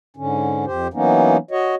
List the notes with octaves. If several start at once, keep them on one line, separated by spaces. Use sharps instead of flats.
G#2 D3 C#4
F2 G4 C5
E3 F#3 A#3 B3 C#4 D#4
F#4 C#5 D#5